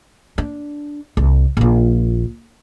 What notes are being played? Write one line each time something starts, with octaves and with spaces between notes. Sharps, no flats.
D4
C2
A#1 F4